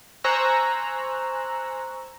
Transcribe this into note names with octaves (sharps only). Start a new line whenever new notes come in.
C5 G#5 A#5 C#6 E6 F#6